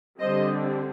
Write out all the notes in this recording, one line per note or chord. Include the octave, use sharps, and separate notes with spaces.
D3 G3 C4 C5 D#5